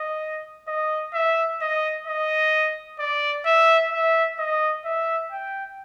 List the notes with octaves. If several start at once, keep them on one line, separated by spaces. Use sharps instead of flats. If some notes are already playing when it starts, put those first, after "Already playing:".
Already playing: D#5
D#5
E5
D#5
D#5
D5
E5
E5
D#5
E5
G5